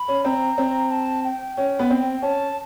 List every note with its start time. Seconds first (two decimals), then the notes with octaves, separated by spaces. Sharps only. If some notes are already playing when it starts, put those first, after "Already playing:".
Already playing: B5
0.08 C#4
0.25 C4 A#5
0.58 C4
0.91 A5
1.24 G5
1.57 C#4 G5
1.79 B3
1.90 C4
2.22 C#4 A5